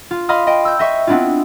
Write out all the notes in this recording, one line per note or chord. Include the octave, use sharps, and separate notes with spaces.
F4
D#5 F5 B5 C6 D#6 F6
D#5 G5
E6 G6
D#5 E5 C#6
B3 C4 D4 E4 F4